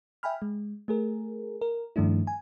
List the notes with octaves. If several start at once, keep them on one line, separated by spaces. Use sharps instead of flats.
E5 G5 G#5 B5 F6
G#3
A3 G#4 A#4
A#4
G2 D#3 F3 A3 D4 E4
G#5